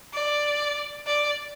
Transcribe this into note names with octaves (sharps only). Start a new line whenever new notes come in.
D5
D5